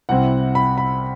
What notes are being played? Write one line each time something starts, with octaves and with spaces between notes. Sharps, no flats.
C2 C3 G3 C4 E4 F#5
B5
B5